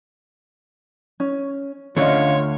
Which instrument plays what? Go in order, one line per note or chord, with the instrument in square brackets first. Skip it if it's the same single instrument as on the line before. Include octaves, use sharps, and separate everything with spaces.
[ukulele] C#4
[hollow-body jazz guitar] D2 D3 [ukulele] C#4 D#5 [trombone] F4 [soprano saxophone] C#5